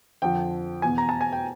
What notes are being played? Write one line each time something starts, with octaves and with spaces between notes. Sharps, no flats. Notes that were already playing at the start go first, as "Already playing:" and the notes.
F2 D3 F3 G5
E2 B2 G#5
A#5
A5
G#5
G5